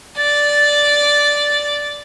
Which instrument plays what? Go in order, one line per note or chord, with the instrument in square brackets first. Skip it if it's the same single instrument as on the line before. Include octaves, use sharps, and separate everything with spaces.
[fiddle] D5 [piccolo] A6